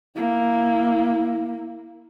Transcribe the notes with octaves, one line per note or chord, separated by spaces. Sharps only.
A#3 E4